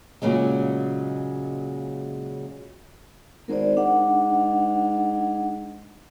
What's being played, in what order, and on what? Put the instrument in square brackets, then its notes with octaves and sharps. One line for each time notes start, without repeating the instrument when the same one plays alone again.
[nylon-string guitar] A#2 C#3 F#3 G#3
[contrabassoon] G#1 [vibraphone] A#4 C5 D5
[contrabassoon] G#2 [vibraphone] D4 F#5